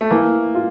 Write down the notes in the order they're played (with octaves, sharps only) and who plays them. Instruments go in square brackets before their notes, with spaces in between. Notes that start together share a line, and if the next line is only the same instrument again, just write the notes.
[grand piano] A3
[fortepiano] E3 [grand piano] A#3
[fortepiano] F4